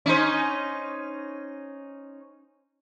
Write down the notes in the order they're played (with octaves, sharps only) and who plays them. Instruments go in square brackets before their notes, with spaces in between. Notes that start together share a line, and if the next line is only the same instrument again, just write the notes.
[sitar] C#4 D#4 C5